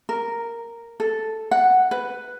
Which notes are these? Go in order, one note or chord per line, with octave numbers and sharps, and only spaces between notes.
A#4
A4
F#5
B4